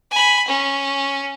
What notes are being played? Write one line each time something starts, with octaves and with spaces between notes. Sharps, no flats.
G#5 B5
C#4